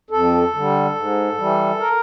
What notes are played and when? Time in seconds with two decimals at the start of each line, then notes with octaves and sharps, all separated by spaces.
0.10 F2 A4
0.53 D3 G3
0.95 G#2
1.38 E3 G3
1.80 A#4